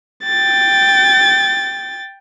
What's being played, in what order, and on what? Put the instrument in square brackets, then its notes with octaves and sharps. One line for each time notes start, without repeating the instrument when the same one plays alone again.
[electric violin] G5 A6